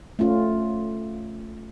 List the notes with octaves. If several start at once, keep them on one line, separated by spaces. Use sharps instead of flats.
A3 C#4 F4